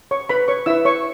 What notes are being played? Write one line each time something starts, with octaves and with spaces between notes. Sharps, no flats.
C#5 C#6
B4 B5
C#5 C#6
E4 B4 E5 E6
C#5 C#6